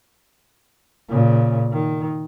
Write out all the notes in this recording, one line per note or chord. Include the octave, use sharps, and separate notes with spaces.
A#2 C#3
D#3